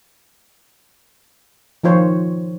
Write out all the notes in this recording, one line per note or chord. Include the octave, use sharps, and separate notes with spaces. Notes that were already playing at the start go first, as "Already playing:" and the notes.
D#3 F3 F4 C5 C#5